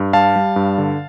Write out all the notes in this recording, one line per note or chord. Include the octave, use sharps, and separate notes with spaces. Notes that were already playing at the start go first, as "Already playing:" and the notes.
Already playing: G2
G3 F5 A5
G3
G2
D3